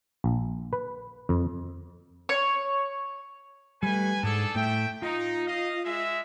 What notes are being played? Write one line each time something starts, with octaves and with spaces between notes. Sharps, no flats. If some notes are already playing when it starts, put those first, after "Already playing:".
A#1
B4
F2
C#5
G3 A3 B4 G#5
G#2 D4 G#4 A4
A2 A3 E5 G5
D#4 F4
D#5 F5
G#3 E5